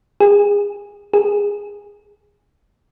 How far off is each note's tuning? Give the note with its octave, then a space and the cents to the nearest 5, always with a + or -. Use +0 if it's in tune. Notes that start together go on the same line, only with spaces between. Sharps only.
G#4 -25
G#4 -15